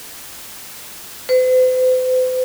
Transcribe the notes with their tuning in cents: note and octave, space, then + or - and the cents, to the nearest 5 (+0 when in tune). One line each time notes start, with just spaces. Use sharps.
C5 -45